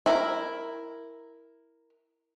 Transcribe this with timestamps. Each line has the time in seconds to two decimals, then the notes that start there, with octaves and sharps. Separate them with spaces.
0.06 E4 A#4